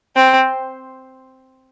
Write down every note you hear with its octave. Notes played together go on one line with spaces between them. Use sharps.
C4